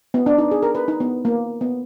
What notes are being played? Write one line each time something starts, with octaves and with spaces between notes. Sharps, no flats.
B3
D4
D#4
G#4
A#4
B4
D#4
B3
A#3
B3